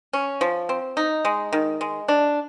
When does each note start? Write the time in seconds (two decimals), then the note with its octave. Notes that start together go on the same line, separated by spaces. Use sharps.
0.13 C#4
0.41 F3
0.69 C4
0.97 D#4
1.25 G#3
1.53 D#3
1.81 G#3
2.08 D4